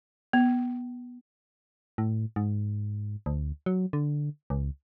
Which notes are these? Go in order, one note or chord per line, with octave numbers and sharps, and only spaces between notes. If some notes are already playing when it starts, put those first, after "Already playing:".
B3
A2
G#2
D2
F#3
D3
C#2